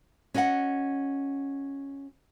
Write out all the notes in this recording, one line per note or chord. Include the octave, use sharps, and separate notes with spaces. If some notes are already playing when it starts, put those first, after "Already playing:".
C#4 F#4 D#5 F5 F#5